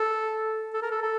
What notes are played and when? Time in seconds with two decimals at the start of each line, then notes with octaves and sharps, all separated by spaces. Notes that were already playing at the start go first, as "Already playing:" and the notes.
Already playing: A4
0.73 A4
0.82 A#4
0.91 A4
1.02 A4